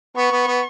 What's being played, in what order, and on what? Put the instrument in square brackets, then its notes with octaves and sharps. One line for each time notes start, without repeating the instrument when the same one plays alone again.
[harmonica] B3 [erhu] C#6
[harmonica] B3
B3